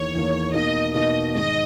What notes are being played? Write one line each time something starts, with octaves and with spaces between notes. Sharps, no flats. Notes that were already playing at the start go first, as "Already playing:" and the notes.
Already playing: E2 D#3 A#3 C#5
E2 D#3 A#3
B2 A#3 D#4 D#5
B2 A#3 D#4 D#5
G#2 D#3 G#3 D#5